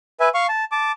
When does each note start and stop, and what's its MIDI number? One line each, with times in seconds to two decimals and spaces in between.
0.20 0.29 71
0.20 0.29 76
0.20 0.29 80
0.34 0.47 77
0.34 0.47 85
0.34 0.47 89
0.49 0.65 81
0.72 0.92 81
0.72 0.92 86